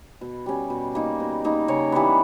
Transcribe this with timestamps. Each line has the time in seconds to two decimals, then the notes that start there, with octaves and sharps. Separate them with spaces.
0.21 B2
0.46 G3 C#4
0.70 B2
0.95 A#3 D#4
1.20 B2
1.44 A#3 D#4
1.68 C#3 C#5
1.92 E3 G3 B3